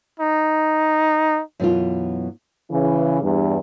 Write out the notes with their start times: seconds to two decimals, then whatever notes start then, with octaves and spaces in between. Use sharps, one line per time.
0.19 D#4
1.60 F#2 B2 E3 F4
2.71 C#3 E3
3.22 E2 G2